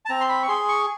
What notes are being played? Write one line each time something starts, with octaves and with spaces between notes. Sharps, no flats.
A5
C4 A#5
C6
B5
C#6
G#4 C6
C#6